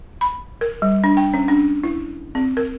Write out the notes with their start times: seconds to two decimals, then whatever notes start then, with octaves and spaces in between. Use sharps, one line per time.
0.21 B5
0.61 A#4
0.82 G3
1.04 D4
1.17 G5
1.34 C#4
1.48 D4
1.84 E4
2.35 C4
2.57 A#4